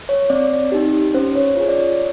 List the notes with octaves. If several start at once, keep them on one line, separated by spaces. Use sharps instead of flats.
C#5
C4 D5
D#4 G4
C#4 C5
C#5
F4 G#4 C#5
D5
C#5